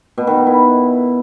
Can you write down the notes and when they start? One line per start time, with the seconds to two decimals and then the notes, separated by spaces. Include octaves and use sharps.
0.18 B2
0.27 D#3
0.37 B3
0.47 E4